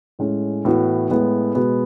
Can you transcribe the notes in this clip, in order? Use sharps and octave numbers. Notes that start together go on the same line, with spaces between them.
A2 G#3 C#4
A2 E3 B3 F#4
A2 G#3 B3
B2 G#3 B3 F#4